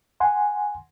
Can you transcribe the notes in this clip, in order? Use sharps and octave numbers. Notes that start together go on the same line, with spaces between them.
F#5 G#5 C6